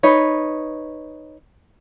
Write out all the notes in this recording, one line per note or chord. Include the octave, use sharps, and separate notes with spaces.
D#4 B4 C#5